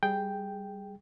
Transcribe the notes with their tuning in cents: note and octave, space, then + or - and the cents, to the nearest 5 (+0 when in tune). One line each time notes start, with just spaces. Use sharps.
G3 +0 G#4 +0 G5 +0